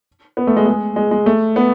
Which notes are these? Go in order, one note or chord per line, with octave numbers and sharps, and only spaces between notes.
B3
A3
G#3
G#3
G#3
G#3
A3
B3